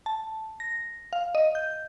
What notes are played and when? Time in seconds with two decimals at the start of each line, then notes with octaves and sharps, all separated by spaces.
0.06 A5
0.60 A#6
1.13 F5
1.35 D#5
1.55 G6